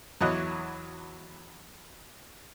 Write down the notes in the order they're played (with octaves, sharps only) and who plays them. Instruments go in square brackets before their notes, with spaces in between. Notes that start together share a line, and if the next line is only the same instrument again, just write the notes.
[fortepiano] E2 E3 F#3 C#5 D#5 F#6